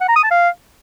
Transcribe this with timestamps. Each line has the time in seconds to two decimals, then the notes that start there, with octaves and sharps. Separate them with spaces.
0.01 F#5
0.08 A#5
0.16 D#6
0.23 A5
0.31 F5